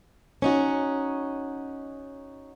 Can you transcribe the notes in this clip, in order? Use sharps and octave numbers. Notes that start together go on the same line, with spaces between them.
C#4 D#4 F#4